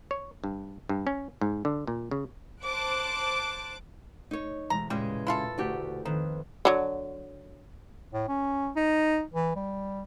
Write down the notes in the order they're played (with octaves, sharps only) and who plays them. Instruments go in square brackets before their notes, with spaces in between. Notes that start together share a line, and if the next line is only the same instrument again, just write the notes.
[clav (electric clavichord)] C#5
G2
G2
C#4
G#2
D3
A#2
C#3
[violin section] C5 A5 D6 F#6 D7
[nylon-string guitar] D#4 C#5
[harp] E1 G#3 A3 [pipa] A#5
[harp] E2 A#2 [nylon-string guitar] C#3 G#3 [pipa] G3
[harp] D4 [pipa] E4 F4 A4
[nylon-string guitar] D2 F#4 G4 [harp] A#5 G6 B6
[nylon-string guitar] F2 [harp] D#3 B4 E7 [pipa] D#4
[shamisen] D3 F#3
[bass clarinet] A2
C#4
D#4
E3
G3